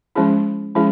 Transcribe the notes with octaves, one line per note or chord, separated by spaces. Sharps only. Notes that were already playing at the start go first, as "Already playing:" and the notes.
F3 G#3 C#4 E4 G#4
F3 G#3 C#4 E4 G#4